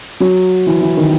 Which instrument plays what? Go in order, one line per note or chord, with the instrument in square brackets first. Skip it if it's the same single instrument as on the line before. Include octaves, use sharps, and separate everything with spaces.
[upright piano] F#3
E3
E3
D#3